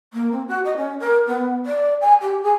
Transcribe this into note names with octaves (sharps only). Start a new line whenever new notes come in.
A#3
C4
F#4
D#5
C#4
A#4
B3
D5
G#5
G4
G#4